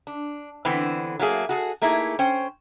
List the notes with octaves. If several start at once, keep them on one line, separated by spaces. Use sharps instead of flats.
D4
D3 E3 B3 C4
F#3 A3 A#3 G#4
F#4 G#4 A4
A3 A#3 D#4 E4 G#4
C#4 C5 G5